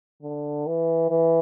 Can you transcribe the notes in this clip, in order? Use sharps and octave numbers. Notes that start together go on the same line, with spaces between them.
D3
E3
E3